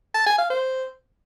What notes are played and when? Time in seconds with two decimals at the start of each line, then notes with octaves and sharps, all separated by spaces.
0.14 A5
0.26 G#5
0.38 F5
0.50 C5